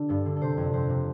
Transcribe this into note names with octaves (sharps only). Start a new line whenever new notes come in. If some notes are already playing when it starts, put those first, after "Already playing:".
Already playing: D3 G4
G2 A4
D3
A4
C3 C5
F2
F2 C5
C3